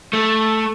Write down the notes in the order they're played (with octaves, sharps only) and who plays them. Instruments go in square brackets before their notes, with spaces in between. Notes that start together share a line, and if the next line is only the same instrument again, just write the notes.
[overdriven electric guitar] A3